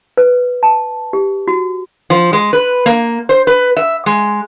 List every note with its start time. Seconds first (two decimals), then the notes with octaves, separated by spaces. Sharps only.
0.17 B4
0.63 A5
1.13 G4
1.48 F#4
2.10 F3
2.33 G#3
2.53 B4
2.86 A#3
3.29 C5
3.47 B4
3.77 E5
4.06 G#3